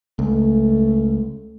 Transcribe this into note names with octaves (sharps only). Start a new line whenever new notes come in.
C#2 A3